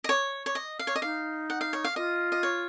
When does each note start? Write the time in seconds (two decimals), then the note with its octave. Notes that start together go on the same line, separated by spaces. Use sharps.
0.04 D#5
0.09 C#5
0.46 C#5
0.55 D#5
0.79 F5
0.87 C#5
0.96 D#5
1.02 D#4 F5
1.50 F#5
1.61 F5
1.73 C#5
1.84 F5
1.96 F4 D#5
2.32 D#5
2.43 C#5